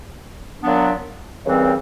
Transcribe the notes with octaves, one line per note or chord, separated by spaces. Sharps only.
A#2 F#3 B3 D4
D#2 C#3 E3 G3 C4